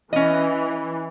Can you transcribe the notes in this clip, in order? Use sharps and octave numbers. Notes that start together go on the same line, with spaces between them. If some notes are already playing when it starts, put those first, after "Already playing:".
E3 C#4 D#5